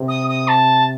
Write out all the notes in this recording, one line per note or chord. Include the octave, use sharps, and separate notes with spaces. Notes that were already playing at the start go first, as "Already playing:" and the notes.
Already playing: C3
D#6
D#6
A5